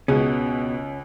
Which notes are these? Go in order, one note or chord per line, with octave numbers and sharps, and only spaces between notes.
C#2 B2 C#4 G#4